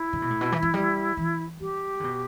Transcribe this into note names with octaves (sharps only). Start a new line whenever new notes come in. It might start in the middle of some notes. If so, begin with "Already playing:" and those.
Already playing: E4
D3
B2
A2
B2
E3
E3
G3
E3
G3 G4
D3
B2